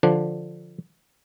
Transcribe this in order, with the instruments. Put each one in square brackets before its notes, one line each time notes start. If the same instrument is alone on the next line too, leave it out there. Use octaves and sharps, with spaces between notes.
[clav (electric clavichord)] D3 F3 D4